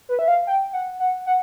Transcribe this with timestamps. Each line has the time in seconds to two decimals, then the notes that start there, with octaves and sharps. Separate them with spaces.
0.09 B4
0.19 E5
0.28 F5
0.47 G5
0.73 F#5
1.00 F#5
1.26 F#5